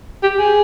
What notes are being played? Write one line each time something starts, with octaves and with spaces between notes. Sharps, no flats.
G4
G#4